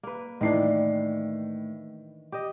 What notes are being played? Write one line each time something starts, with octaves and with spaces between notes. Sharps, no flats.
A#3 B4
A2 D#3 E3 D4 C7
G4 D#5